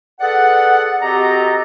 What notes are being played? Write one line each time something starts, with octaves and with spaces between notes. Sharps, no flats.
G#4 A4 B4 D5 F#5
C4 F#4 G4 A4 D#5 A#5